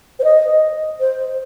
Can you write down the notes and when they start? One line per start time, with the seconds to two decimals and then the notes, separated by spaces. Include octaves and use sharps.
0.19 C5
0.24 D#5
1.00 C5